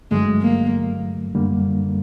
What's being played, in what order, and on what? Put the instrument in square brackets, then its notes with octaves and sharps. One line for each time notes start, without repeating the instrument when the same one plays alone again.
[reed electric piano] G2 D3 F#3 A3 [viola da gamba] G#3
[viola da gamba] A#3
[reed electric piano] F#2 D3 G3 A#3